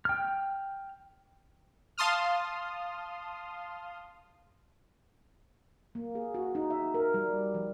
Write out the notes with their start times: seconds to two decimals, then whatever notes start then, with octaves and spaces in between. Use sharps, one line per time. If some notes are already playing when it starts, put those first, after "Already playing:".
0.05 G5 F6
1.98 F5 A5 C6 D#6 F6
5.95 A#3
6.15 G#4
6.34 F#4
6.55 D#4
6.70 E5
6.94 A#4
7.14 G3
7.54 F3